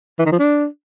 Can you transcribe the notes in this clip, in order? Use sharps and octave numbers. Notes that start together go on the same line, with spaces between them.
E3
D#3
F3
D4